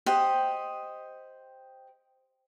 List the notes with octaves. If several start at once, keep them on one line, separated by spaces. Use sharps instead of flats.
G4 C5 D#5 F#5